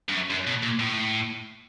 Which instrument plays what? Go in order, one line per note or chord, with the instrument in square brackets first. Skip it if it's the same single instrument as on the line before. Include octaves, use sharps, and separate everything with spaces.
[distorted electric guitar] G2
F#2
F#2
B2
A#2
A2